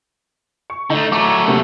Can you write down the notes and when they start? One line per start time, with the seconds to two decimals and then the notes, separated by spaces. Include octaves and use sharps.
0.70 C#6
0.90 D3 A3 D#4
1.12 F#3 A3 A#5 C#6 D6
1.47 D2 C3 A#3